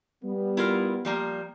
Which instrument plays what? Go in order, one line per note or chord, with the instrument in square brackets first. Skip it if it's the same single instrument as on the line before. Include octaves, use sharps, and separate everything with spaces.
[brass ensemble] G3 B3
[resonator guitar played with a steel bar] E4 F4 A#4
F3 G3 A#3